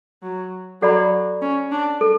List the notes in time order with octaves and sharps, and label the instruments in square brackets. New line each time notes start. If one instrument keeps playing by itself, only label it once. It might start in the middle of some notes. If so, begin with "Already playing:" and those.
[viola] F#3
[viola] F#3 [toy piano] A4 D5 F#5 B5
[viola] C#4
D4
[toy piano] A4